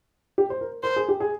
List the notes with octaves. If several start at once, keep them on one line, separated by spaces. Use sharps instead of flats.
G4
C5
A#4
A#4 C5
G#4
G4
G#4